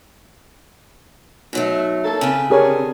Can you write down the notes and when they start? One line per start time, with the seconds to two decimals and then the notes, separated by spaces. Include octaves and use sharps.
1.53 B2 F#3 A3 D#4
2.04 A#3 C#4 A4
2.21 C#3 C4 B4
2.50 D3 G4 G#4 A#4 C#5